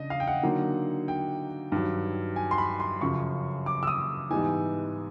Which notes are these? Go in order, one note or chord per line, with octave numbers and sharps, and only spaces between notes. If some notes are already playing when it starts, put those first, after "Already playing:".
Already playing: C#3 D4 D#5
F5
G5
F#5
D3 F#3 A#3 D#4
G5
G2 D#3 F#3
G#5
C6
B5
C6
F#2 C#3 F3 C#6
D6
E6
D#6
G#2 E3 G3 B3 D#4 G#5